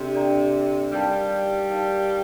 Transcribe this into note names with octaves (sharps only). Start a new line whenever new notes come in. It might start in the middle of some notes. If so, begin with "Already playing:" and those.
Already playing: C3 D4 A4 D5 G5
D4 A4 D5 G5 A#5
G3 D#4 A#4 D5 F5 A5
D#4 A#4 D5 F5 A5